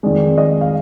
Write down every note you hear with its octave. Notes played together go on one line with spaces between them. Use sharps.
F2 D#3 G#3 D5
D#5
F5